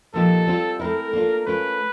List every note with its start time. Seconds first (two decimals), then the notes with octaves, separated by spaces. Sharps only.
0.14 A#2 F3 A#3 D#4 G4 A4
0.47 G3 C4 F4
0.79 A3 C4 E4 A#4
1.13 A#3 D4 F4
1.46 A3 C#4 F4 A#4 B4